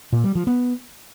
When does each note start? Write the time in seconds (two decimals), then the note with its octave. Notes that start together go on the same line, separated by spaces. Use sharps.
0.13 A#2
0.24 G3
0.35 F3
0.47 B3